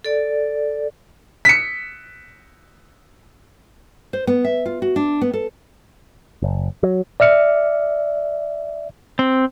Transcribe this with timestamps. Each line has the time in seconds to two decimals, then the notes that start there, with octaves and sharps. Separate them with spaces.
0.04 A4 D5
1.45 B6 C#7
4.13 C5
4.27 B3
4.44 E5
4.66 F4
4.82 F#4
4.96 D4
5.21 B3
5.33 A4
6.42 F#1
6.83 F#3
7.20 D5 E5 F6 C#7
9.19 C4